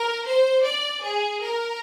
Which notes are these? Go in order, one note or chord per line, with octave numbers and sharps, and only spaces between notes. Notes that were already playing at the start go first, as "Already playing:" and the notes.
Already playing: A#4
C5
D5
G#4
A#4